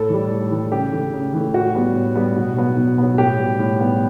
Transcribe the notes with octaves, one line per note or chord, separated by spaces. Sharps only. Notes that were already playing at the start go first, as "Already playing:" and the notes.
Already playing: A2 A4
E3 G3
A2
E3 G3
C#3 G4
E3 A3
C#3
E3 A3
A2 F#4
G3 B3
A2
G3 B3
B2
F#3 B3
B2
F#3 B3
A2 G4
G3 B3
A2
G3 B3